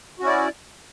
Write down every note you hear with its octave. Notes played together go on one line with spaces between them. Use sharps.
C#4 E4 F#4 D5